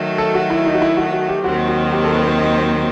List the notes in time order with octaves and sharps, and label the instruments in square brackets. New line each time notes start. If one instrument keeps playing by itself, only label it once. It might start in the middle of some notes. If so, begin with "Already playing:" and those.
Already playing: [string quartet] D#3 F#3 A3
[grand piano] A4
F#4
E4
D#4
F#4
E4
F#4
F#4
G4
[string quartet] D#2 D#3 F#3 C4 [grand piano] F#4
[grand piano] F#4
G4
A4
B4
C5
D#5
C5